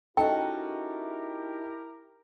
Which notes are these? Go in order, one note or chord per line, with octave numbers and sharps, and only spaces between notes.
C#4 D#4 E4 F#4 G4 A4 A#4 G5